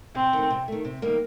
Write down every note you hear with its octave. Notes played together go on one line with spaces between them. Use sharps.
C3 C4
D#3 A3
C3
D#3 A3
C3
D#3 G3 A#3